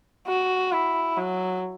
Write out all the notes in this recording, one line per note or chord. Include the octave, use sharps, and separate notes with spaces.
F#4
E4
F#3